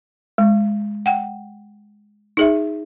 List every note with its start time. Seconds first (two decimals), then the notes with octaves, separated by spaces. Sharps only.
0.38 G#3
1.06 F#5 G5
2.37 D#4 G#4 E5